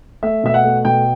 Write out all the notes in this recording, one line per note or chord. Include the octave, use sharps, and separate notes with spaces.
A3 E5
B2 E5
F#5
A3
B2 G5